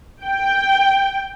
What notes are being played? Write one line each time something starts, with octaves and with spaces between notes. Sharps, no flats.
G5